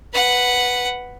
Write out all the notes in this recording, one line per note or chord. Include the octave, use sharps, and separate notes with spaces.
B4 F#5